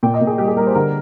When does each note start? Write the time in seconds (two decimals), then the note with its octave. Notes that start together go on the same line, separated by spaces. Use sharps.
0.03 A#2 G5
0.14 D#5
0.21 A#2
0.27 G#4
0.38 G3 G4
0.47 G#4
0.57 G3 A#4
0.67 C5
0.75 D3 A#4